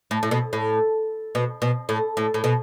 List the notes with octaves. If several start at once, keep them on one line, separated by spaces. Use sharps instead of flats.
A2
A2
B2
A2
B2
B2
A2
A2
A2
B2